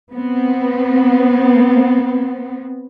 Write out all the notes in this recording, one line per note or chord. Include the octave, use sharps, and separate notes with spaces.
B3 C4